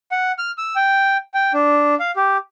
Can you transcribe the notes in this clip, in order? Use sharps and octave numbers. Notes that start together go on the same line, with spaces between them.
F#5
F6
E6
G5
G5
D4
F5
G4